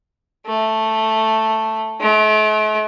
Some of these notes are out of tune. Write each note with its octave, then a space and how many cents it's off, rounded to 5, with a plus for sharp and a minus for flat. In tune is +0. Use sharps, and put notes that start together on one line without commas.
A3 +0
A3 -45